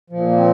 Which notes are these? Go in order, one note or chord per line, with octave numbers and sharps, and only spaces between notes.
A#2 F3
A#3
C4